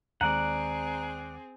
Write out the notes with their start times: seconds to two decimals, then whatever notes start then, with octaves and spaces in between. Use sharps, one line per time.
0.21 D#2 D#3 G#3 C4 G#4 D5 F#5 A#5